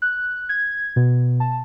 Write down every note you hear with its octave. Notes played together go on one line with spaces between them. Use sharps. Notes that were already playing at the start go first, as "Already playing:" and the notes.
F#6
G#6
B2
A5